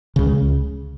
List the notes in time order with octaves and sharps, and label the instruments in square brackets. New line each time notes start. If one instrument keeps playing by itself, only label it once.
[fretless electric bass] C#2 C#3